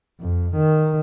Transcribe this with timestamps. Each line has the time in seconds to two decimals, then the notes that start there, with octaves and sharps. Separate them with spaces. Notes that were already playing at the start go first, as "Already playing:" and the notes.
0.20 F2
0.56 D#3